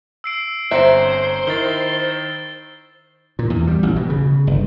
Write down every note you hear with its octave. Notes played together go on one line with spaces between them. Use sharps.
E6 C7 D7
G1 C4 C5 E5 A#5 C#7
D#3 D#4 E4 A6 G7
A#2
E2
G3
A1
B2
C#3
G1